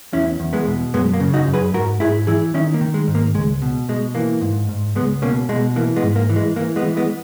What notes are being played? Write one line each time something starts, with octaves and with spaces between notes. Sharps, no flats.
E2 C#4 E4
E2
G#3 B3
B2
F#2 G#3 B3
A#3
C#3
D#4 F#4
F#2
G#4 B4
G#2 F#4 A#4
G#2 E4 G#4
E3 E4 G#4
D#3 C#4 E4
A#3
D#3
G#3
G#2
A#3
C#2 G#3
B2
B2 G#3
E3 A#3
G#2
G#2
C#2 G#3 B3
B2 A#3 C#4
B2 G#3
E3 A#3
G#3 B3
G#2
A#3
E3
G#3
E3 A#3
G#3 B3
E3
G#3 B3